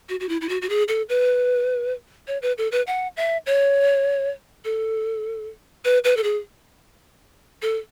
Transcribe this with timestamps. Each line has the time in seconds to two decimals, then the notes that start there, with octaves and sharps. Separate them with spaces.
0.09 F#4
0.20 F#4
0.29 E4
0.41 E4
0.49 F#4
0.62 F#4
0.69 G#4
0.88 A4
1.09 B4
2.28 C#5
2.42 B4
2.58 A4
2.72 B4
2.87 F#5
3.17 E5
3.46 C#5
4.65 A4
5.85 B4
6.04 B4
6.17 A4
6.23 G#4
7.62 A4